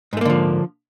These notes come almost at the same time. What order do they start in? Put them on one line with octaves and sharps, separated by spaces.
G#2 A3 A#3 D3 F3